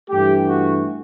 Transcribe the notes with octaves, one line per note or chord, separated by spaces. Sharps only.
G2 E3 A3 G4
F#4